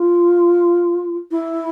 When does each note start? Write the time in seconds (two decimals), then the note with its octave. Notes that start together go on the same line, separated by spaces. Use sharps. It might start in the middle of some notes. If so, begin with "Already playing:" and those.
Already playing: F4
1.31 E4